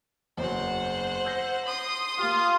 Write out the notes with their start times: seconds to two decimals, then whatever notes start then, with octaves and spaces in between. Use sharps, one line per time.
0.37 F#1 E2 F#3 C5 F#5
1.25 E6 G6 A#6
1.65 C6 D#6
2.19 A#3 F4 G4